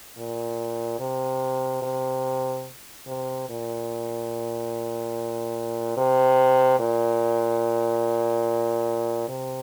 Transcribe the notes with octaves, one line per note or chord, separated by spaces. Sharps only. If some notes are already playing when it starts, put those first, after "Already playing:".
A#2
C3
C3
C3
A#2
C3
A#2
C3